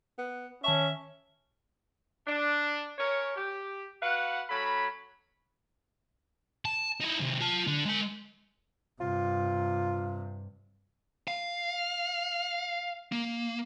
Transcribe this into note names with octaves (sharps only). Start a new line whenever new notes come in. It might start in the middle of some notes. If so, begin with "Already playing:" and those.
B3
D#3 C#4 E5 A5 C#6
D4
C#4 A#4 C#5
G4
F#4 B4 F5 F#5
F#3 C#4 A4 B5
A5
D#4 E4
C3 D#3
F4 A5
D3
G#3 A5
G2 C3 F4
F5
A#3